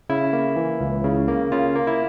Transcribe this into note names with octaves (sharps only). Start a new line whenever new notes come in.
C#3 E4
A#3
E3
C#2
C#3
A#3
C#3 F4
A#3
E4